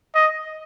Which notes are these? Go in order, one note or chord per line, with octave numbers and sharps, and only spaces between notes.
D#5